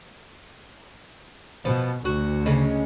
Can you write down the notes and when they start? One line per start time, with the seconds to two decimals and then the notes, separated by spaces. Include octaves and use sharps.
1.65 B2 F3 B3
2.05 D2 F#4
2.46 C#3 G#3 C#4